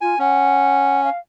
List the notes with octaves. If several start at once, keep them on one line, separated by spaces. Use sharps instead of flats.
F4 G#5
C#4 F#5
F5